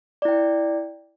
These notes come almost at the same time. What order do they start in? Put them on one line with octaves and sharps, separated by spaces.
D5 E4 G5